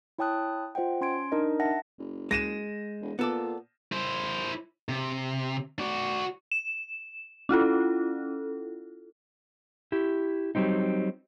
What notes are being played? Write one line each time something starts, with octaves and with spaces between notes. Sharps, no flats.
E4 C#5 G5 A5 D#6 F#6
F4 C5 D#5 F#5 G5
C#4 C6 G#6 D7
D4 D#4 A#4 D#5
E5 F#5 A5 A#6
F#1
G#3 A#6 D#7 E7
E1
A#2 B3 A4 D5
E4 C5
C3
F#4 D5
E7
C#4 E4 F4 A4
E4 G4
F#3 G3 C4 D#4